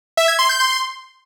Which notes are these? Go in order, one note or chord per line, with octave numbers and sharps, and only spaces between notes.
E5
G#6
C6
G6
C6